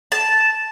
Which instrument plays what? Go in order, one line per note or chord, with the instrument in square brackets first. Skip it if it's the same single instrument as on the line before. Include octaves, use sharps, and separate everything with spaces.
[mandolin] A5